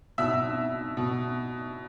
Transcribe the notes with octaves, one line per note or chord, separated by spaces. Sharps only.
B2 E5 E6
B2